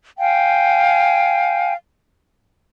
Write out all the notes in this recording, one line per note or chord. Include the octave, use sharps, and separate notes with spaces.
F5 G5 G#5